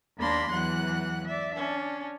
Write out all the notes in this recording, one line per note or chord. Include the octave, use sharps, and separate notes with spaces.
D#2 A#3 D4 B5 C6 A#6
E2 E3 F#3 F#5 F#6
D5 E5
C#4 D4